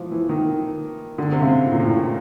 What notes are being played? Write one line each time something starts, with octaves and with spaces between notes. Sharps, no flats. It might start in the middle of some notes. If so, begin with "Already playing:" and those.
Already playing: E3 F3
E3
D#3
D3
C3
C#3
A2
A#2
A2
A#2